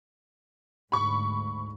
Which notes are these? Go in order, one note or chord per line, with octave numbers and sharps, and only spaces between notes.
D2 G#2 B5 C#6